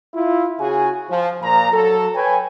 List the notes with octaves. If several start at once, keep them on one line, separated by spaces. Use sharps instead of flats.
E4 F4
C#3 F#4 G#4 G#5
F3
A#2 F3 F4 A#5
F#3 A4
B4 C#5 G5 G#5